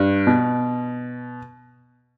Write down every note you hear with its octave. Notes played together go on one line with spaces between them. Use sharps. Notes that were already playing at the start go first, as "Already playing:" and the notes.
Already playing: G2
B2